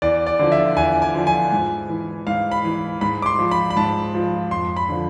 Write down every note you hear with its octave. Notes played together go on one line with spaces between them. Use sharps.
E2 D5
D5
D3 F3
E5
E2 G#5
G#5
D3 F3
G#5
G#2
E3
G#2 F5
B5
E3
G#2 B5
D6
C6
F3
B5
B5
G#2 A5
F3
F2 C6
B5
D3 F3